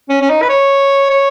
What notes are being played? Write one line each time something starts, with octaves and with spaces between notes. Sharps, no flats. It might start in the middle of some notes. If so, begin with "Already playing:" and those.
C#4
C#4
D#4
B4
C#5
C#5